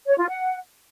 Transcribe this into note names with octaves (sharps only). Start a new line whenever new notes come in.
C#5
F4
F#5